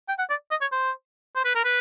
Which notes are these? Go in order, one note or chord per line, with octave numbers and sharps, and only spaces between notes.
G5
F#5
D5
D#5
C#5
C5
C5
B4
A#4
B4